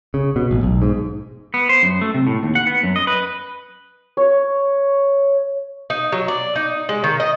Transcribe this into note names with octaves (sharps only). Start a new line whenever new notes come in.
C#3
B2
A1
B1
G#2
B3
C5
F#2
A3
C3
A2
D#2
F#5
B3
F#2
D#5
B4
C#5
D#4
F#3
D5
D#4
G#3
D#3
D#5